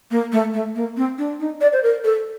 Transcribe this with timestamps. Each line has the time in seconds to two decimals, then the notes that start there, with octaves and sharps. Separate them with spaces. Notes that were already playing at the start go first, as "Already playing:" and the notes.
0.11 A#3
0.32 A3
0.54 A3
0.75 A#3
0.97 C4
1.18 D4
1.40 D#4
1.61 D5
1.73 C5
1.83 A#4
2.04 A4